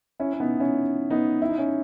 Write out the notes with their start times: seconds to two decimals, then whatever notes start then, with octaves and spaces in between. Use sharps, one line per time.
0.20 C#4 E4
0.33 C#4
0.40 B3 D#4
0.60 C#4 E4
1.10 B3 D#4
1.42 E4
1.49 D#4
1.58 C#4 E4